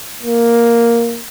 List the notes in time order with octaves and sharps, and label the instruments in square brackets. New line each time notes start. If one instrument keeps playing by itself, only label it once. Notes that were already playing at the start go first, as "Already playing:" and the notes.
[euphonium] A#3